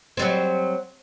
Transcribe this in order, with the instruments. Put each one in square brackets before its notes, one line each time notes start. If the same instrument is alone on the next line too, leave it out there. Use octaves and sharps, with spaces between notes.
[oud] F#3 G3 C4